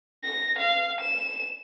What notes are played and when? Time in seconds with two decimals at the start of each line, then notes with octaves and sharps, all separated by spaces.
0.24 A#6
0.58 F5
1.00 E7